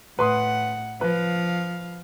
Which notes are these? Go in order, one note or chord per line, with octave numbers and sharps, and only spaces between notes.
A2 B4 F#5 C6 D#6
F3 B4 F5